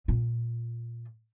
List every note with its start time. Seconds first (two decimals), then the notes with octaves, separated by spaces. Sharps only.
0.08 A#2 F4